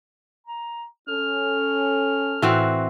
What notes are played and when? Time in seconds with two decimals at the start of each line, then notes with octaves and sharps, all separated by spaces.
0.47 A#5
1.08 C#4 A4 F6
2.42 A2 E3 C4 F#4